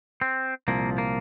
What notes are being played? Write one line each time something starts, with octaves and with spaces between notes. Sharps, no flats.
C4
C2 A#2 F3 A#3
A#3